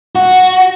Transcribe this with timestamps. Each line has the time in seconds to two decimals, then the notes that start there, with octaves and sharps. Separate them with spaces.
0.15 F#4